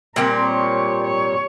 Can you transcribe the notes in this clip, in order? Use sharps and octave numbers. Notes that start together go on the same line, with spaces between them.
A#2 G3 C4 A#4
C#5
C#5